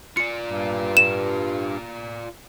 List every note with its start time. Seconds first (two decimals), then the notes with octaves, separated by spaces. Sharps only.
0.17 F4 D5 C#7
0.47 G2
0.97 E7